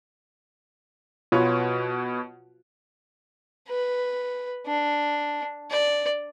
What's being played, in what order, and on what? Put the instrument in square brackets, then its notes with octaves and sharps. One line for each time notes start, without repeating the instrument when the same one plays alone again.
[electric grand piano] B2 B4 C#5 [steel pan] F4 F#4
[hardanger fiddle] B4
D4
D5